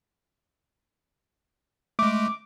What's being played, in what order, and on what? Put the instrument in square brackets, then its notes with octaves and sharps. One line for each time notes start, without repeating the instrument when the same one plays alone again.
[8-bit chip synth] G#3 A3 [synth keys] D6